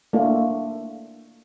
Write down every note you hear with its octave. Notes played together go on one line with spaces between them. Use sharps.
A3 A#3 D4 F4